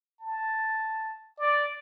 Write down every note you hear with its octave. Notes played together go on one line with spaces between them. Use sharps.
A5
D5